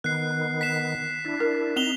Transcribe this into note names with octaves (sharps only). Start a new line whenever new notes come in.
D#3 B3 F#6 C7
B6 C7 E7
D4 E4
A#4
C4 D#4 E7 F7 G7